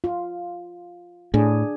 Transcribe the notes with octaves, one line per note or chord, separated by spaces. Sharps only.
F4
A2 D4 G#4